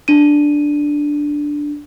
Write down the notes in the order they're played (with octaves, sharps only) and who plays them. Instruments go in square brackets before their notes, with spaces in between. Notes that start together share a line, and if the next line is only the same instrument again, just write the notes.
[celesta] D4 D#7